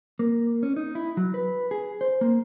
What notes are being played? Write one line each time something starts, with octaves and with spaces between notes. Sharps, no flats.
A#3
C#4
D#4
E4
F#3
B4
G#4
C5
A#3